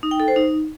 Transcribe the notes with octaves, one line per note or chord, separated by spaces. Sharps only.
D#4
G5
A4
C5
D#4